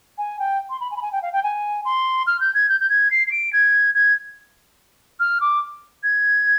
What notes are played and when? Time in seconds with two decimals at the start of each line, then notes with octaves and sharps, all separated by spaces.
0.18 G#5
0.39 G5
0.70 C6
0.80 B5
0.91 G#5
0.97 B5
1.02 G#5
1.12 G5
1.22 F5
1.33 G5
1.43 G#5
1.85 C6
2.27 F6
2.40 G6
2.54 G#6
2.69 G6
2.80 G6
2.90 G#6
3.11 C7
3.27 C7
3.31 D7
3.53 G#6
3.94 G#6
5.20 F6
5.41 D6
6.03 G#6